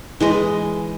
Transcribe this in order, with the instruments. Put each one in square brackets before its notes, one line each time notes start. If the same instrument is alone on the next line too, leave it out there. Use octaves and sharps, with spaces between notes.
[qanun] E3 G#3 D#5